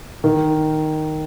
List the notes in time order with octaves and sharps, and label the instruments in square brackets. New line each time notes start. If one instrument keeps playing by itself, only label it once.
[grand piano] D#3